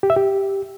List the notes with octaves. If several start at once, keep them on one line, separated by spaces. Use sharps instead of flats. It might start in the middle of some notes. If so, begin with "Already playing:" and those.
G4
E5
G4